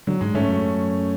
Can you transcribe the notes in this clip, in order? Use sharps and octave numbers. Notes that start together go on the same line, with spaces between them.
D3 F#3
G#2 G#3
G#2 A3 C#4
F#2